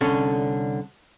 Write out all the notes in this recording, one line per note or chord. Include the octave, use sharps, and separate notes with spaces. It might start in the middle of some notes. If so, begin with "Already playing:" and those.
C2 D3 C#4 A4 C#5